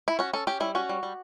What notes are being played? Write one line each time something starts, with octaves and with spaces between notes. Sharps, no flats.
E4
C#4 F#4
C#4 A4
C#4 G4
G3 E4
C#4 F#4
G3
G3